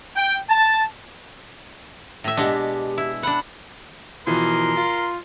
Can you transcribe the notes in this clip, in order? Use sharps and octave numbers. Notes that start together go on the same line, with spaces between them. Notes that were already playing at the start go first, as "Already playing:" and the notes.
G5
A5
A2 E5
B2 G#3 D4 G4
E4
D4 F#5 B5
B2 E3 F3 A#4 C6
F4